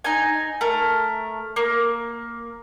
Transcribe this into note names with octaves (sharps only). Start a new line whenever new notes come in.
D#4 G#5
A3 A#4
A#3